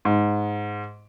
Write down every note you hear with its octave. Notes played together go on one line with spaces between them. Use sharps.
G#2